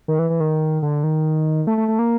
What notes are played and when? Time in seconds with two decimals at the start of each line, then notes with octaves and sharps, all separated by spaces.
0.08 D#3
0.19 E3
0.30 E3
0.40 D#3
0.82 D3
1.04 D#3
1.67 A3
1.78 A3
1.88 A3
1.99 A#3